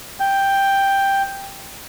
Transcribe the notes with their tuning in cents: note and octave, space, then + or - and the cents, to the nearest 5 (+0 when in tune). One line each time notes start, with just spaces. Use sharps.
G5 +5